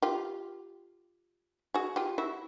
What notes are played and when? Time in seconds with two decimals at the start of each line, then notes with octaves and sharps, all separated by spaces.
0.02 F4 G4
1.74 F#4 G#4
1.96 F4 G4
2.18 E4 F#4